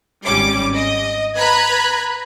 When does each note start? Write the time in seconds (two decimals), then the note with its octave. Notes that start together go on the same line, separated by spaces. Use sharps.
0.25 G#1 G3 C#4 D6
0.73 D#5
1.38 B4 A#5 B5 F#6 G#6